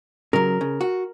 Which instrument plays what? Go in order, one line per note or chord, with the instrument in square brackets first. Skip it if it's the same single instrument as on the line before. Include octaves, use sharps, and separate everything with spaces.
[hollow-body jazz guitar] C#3 F#3 [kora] A#4
[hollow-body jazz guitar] C#3
F#4